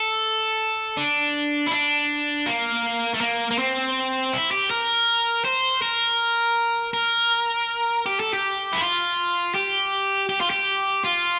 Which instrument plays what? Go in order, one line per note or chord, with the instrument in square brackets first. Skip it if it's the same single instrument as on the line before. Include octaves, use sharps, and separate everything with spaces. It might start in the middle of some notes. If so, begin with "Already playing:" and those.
Already playing: [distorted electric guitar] A4
D4
E4
D4
A#3
A3
A#3
A#3
C4
E4
G4
A#4
C5
A#4
A#4
G4
A4
G4
E4
F4
G4
G4
F4
G4
F4